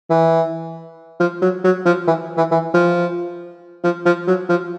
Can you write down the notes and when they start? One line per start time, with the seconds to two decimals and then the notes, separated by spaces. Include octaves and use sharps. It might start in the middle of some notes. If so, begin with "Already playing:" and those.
0.10 E3
1.20 F3
1.42 F#3
1.64 F#3
1.85 F3
2.08 E3
2.37 E3
2.51 E3
2.74 F3
3.84 F3
4.06 F3
4.27 F#3
4.49 F3